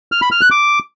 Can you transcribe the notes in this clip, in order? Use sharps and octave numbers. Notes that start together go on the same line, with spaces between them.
F6
B5
F6
F#6
D6